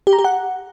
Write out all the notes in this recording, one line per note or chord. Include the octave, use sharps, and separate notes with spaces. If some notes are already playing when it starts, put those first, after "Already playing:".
G4
A#5
G4
F#5